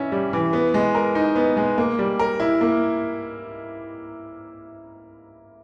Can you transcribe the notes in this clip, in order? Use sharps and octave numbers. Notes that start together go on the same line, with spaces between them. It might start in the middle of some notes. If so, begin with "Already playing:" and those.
Already playing: E3 C#4 E4
G3
E3
B3
G#3
A#4
D#4
B3
G#3
A#3
G3
A#4
E4
A#3